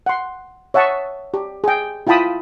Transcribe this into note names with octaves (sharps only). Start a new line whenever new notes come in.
F#5 C6
C#5 E5 F#5 A5 C#6 D#6
G4
G#4 G5
E4 F4 G5 A5 B5 D#6